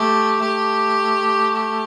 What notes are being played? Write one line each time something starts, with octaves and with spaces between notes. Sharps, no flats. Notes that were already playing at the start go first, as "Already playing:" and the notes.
Already playing: A3 G4
A3 G4
G4